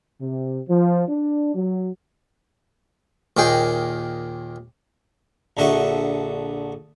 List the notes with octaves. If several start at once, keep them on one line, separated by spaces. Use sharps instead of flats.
C3
F3
D4
F#3
D#2 A#2 D#3 G#4 G5
A#1 D3 F#4 D#5 E5 C#6